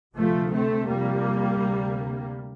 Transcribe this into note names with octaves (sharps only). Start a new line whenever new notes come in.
D2 C3 F3 A3
A3 C4
F2 C3 G3 A#3
D2 C3